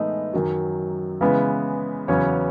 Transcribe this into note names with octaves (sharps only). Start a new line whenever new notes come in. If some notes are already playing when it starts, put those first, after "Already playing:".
Already playing: A2 E3 G#3 A3 B3 D#4 D#5
F#2 D#3 F#3
C#3 E3 G#3 B3
E2 C#3 F#3 B3 C#4 C#5